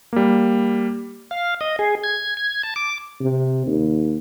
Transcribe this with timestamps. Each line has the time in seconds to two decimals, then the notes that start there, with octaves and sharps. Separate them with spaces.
0.13 G3 A#3
1.31 F5
1.61 D#5
1.79 G#4
2.04 G#6
2.37 G#6
2.63 A5
2.76 D6
3.20 C3
3.66 D#2